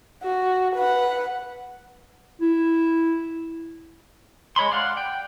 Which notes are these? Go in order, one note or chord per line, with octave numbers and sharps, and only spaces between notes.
F#4
B4 F#5
E4
G#3 C#5 B5 C6
D5 F5 F#5
G5